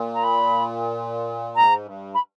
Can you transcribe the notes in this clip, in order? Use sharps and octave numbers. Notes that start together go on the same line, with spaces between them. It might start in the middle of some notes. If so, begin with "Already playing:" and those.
Already playing: A#2
A#5
B5
G#2 A#5
G2
B5